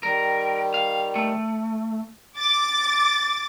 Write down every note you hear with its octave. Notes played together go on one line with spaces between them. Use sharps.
D#3 G3 A#4
F5
A3
D6 A6